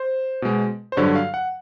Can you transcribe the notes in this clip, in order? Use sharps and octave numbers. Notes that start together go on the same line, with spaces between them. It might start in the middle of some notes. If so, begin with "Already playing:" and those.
Already playing: C5
B2 G#3
C5
G2 D3 F#3 C#5
F5
F#5